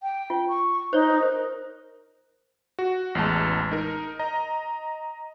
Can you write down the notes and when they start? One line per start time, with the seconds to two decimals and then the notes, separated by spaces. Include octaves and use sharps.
0.03 G5
0.30 F4
0.49 C#6
0.93 D#4 C5 C#5
1.22 A#4 C5
2.79 F#4
3.15 A1 E2 G#3 A5
3.71 D#4 A#4
4.19 D#5 A#5